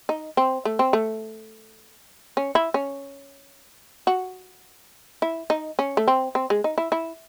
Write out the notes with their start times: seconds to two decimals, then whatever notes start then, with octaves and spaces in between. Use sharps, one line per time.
0.09 D#4
0.37 C4
0.65 A3
0.79 C4
0.93 A3
2.37 C#4
2.55 E4
2.74 C#4
4.07 F#4
5.22 E4
5.50 D#4
5.79 C#4
5.97 A3
6.08 C4
6.35 C4
6.50 G#3
6.64 D#4
6.78 E4
6.92 E4